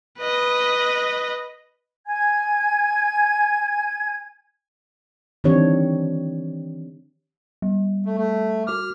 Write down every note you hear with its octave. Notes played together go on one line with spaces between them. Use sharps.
B4 D#5
G#5 G#6
D#3 E3 C4 D4 G4 C#5
G3
A3
A3
F#4 D6 F6